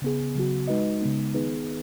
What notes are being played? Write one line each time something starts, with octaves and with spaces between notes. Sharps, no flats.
C#3 B3 G#4
C#3 F#3 B3 F#4
G#3 D#4 F#4 B4 D#5
C#3 G#3 B3 D#4
D#3 B3 D#4 G#4 B4